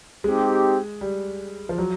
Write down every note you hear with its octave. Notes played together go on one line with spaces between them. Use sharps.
G#3 C4 D#4 G4
G3
F3
F#3